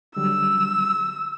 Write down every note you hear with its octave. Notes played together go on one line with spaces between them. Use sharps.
D3 F#3 G3 E6